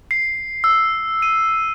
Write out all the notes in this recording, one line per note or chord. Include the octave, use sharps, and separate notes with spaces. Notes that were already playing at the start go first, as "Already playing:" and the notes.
C7
E6
D#7